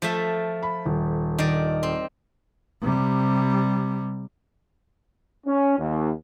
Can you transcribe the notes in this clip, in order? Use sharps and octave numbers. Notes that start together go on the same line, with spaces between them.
F3 A3 E5
B5
D#1
D#3 D5
C4
C3 G3
C#4
D#2